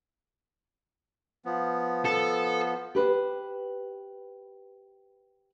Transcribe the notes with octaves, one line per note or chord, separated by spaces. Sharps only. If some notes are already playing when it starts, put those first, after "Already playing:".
F3 B3
A4
G4 B4 C5